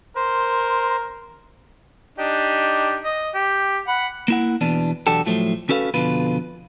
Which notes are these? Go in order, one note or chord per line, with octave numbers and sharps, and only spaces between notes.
A#4 C5 C6
D4 D#4 G4
D#5
G4
F#5 B5
A#3 E4 F#5
E2 B2 E3 D4
B1 E2 D4 F#4 G4 A4
A2 F3 F#3 A3
C#4 F#4 A4 B4 F5
F2 B2 D3 F4 B4